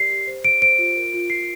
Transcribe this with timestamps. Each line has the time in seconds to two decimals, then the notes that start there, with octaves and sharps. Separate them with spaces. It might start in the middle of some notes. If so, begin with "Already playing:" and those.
Already playing: G4 A#4 D5 C7
0.11 G4
0.27 C5
0.44 C5 D7
0.62 C5 D7
0.79 F4
0.96 A#4
1.14 F4
1.30 F4 C7